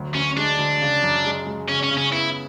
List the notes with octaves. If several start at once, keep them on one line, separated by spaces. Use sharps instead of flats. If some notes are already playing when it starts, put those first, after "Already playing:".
Already playing: D2 F#3
D2 C#4
G#3 D4
D2
C#3
F#2
G#3
G#3
C#3 C#4
C#4
C#3
C#4
B3 E4